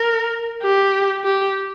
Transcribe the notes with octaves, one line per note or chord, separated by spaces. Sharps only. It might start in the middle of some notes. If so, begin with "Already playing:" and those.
Already playing: A#4
G4
G4